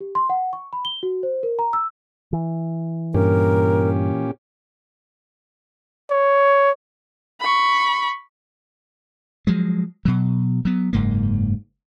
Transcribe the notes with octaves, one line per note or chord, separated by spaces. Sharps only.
G4
C6
F#5
C#6
B5
G7
F#4
C5
A#4
A#5
E6
E3
G2 A#2 C#4 G4 A#4
C#5
B5 C#6
F3 F#3 G#3
B2 F#3
F#3 B3
F#1 G#2 A#3